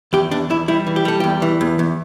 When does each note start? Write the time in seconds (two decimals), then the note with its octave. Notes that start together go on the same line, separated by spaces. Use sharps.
0.13 E2 G4
0.31 E2 D4
0.50 E2 E4
0.68 G3 E4
0.87 E3
0.96 G4
1.05 G3 A4
1.20 E2 G4
1.42 E3
1.61 E2
1.79 E2